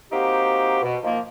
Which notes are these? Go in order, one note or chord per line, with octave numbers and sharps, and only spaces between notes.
A#3 C4 D#4 F#4 G4
B2
D#3 F3 A#3